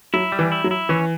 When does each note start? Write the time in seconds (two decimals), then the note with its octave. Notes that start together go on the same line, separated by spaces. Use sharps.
0.13 F#3 E4
0.32 G3
0.39 E3
0.52 E4
0.64 F#3
0.71 E4
0.89 E3 C#4